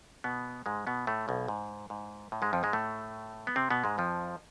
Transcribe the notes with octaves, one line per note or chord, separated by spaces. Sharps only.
B2 B3
G#2 G#3
B2 B3
A2 A3
B1 B2
G#2
G#2
A2
G#2 G#3
F2 F3
G#2 G#3
A2 A3
B3
C3 C4
B2 B3
G#2 G#3
F2 F3